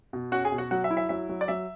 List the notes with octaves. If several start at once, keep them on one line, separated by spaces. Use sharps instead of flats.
B2
C#4 F#4 F#5
G#4 G#5
B2
F#4 F#5
F#3 F#4 F#5
E5
E4
E5
F#3 E5
F#3
D5
F#3 E5